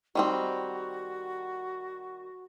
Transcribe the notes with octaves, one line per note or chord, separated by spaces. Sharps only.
D#3 G3 C4 F#4